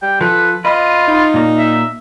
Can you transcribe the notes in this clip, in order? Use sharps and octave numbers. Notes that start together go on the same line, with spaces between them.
G3 G5
F3 A4 B4
F4 B4 D#5
D#4
A#2 A#3
E5